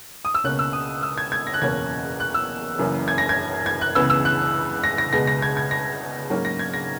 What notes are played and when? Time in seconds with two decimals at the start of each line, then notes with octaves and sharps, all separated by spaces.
0.25 D#6
0.35 E6
0.44 C#2 B2 A#3 C#4 F#6
0.59 E6
0.73 D#6
1.03 E6
1.18 G#6
1.32 G#6
1.47 A#6
1.54 F#6
1.61 F#1 E2 B2 A#3 C#4 G#6
2.20 F#6
2.34 E6
2.78 F#1 F#2 E3 A#3
3.08 G#6
3.18 A#6
3.29 G#6
3.66 G#6
3.81 F#6
3.95 C#2 C#3 E3 B3 E6
4.10 E6
4.25 F#6
4.84 A#6
4.98 A#6
5.13 C#2 B2 G#3 B3 A#6
5.27 A#6
5.42 G#6
5.57 G#6
5.71 A#6
6.30 G#2 F#3 A#3 C#4
6.45 A#6
6.59 G#6
6.74 A#6